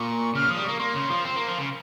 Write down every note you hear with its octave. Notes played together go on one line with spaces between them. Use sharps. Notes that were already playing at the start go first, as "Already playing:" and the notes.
Already playing: A#2 C#6
C#3 F6
F3 D#6
G3
A#3 C#6
A#3 C6
C#3
F3
C4
A#3
F3
C#3